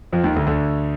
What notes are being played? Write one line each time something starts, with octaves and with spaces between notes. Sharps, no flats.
F2 F3
D#2 D#3
D2 D3
D2 D3